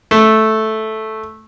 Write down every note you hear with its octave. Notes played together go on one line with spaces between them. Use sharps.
A3